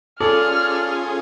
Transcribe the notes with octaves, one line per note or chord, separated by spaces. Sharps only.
C#4 F4 G#4 A4 D5 F6